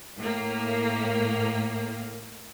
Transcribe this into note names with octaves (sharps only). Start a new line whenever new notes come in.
A2 A#3